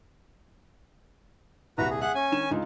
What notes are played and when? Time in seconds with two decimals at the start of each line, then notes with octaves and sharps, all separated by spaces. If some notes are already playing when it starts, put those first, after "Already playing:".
1.78 D#1 C2 F#4 B4 A#5
1.90 G#4
2.01 G#4 E5 F#5 F#6
2.15 C#4 G#5
2.32 D#3 E7
2.51 C#2 D#4 F4